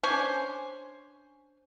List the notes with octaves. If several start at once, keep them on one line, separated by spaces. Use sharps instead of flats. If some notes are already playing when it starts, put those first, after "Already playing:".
C#4 D4 C5 G#5